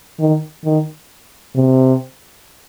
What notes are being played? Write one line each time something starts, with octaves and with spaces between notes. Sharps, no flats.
D#3
D#3
C3